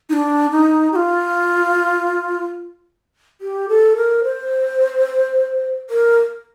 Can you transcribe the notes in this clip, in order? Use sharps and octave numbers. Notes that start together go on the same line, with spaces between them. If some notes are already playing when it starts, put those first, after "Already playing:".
D#4
D4
D#4
G4
F4
G4
A4
A#4
C5
A#4